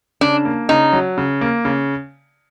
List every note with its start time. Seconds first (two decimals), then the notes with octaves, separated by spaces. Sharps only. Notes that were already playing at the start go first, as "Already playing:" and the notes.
0.21 C#3 D4
0.45 A#3
0.69 C#3 D#4
0.93 F#3
1.18 C#3
1.41 A#3
1.65 C#3